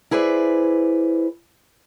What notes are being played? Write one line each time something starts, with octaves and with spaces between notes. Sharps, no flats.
E4 G#4 B4 C5 D5